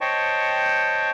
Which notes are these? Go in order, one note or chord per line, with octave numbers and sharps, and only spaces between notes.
C5 C#5 D#5 G5 A5 C#6